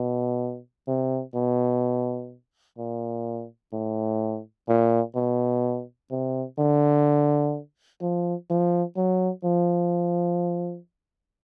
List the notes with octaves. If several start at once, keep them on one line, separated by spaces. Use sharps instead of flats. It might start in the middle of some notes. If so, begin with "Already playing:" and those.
Already playing: B2
C3
B2
A#2
A2
A#2
B2
C3
D3
F3
F3
F#3
F3